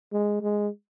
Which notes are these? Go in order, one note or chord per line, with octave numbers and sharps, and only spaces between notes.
G#3
G#3